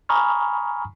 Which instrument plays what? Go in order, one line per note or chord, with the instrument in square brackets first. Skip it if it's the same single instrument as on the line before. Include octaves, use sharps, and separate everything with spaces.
[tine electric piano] G#5 A#5 B5 C#6 D#6 F6